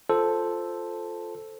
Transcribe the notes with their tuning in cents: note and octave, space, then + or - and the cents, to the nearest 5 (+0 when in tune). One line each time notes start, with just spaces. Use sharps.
F4 +0 A4 +0 C5 +0